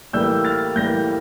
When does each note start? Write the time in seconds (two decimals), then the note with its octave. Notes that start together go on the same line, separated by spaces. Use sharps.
0.13 A2 E3 G3 A#3 E6 G6
0.44 F6 A6
0.76 A2 E3 G3 A#3 G6 A#6